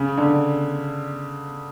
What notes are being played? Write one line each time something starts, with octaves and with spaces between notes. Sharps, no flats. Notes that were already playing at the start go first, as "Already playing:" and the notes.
Already playing: C#3
D3